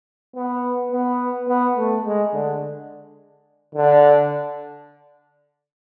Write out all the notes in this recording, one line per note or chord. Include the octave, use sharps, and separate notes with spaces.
B3
B3
B3
A3
G#3
D3
D3